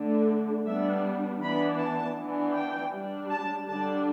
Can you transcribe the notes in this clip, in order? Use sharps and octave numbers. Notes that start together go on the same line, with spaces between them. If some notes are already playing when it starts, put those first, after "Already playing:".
Already playing: D3 A3 D4
G3 B3 D4 E5
E3 B3 D4 B5
A5
E3 B3 D4
G5
G3 D4
A5
D3 G3 D4 A5